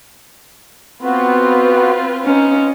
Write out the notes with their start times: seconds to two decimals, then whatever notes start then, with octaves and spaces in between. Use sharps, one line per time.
1.03 B3 C4 F4 F#4 B4
2.25 C#4 D#4